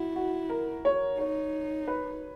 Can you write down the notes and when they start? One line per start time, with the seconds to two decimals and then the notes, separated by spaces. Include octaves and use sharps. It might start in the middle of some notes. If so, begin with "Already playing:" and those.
Already playing: E4 F#4
0.16 F#4
0.50 A#4
0.85 C#5
1.19 D#4 C#5
1.88 B4